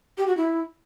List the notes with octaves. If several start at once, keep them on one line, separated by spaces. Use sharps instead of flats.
G4
F#4
E4